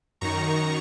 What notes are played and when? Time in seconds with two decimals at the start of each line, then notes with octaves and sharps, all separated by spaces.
0.21 F#2 D#3 A#5 C#6